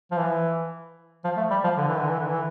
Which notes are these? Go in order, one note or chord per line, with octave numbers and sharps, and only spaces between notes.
F3
E3
F3
A3
G3
F3
D3
E3
D3
E3
D3
E3